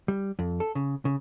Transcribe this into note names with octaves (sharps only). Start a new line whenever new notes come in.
G3
F2
A4
C#3
C#3